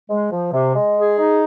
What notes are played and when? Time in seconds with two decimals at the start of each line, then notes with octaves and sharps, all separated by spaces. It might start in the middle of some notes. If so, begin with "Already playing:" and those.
0.10 G#3
0.32 F3
0.53 C3
0.75 G#3
0.96 G#4
1.18 D#4